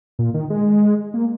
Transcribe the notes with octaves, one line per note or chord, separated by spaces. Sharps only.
A#2
D#3
G#3
A#3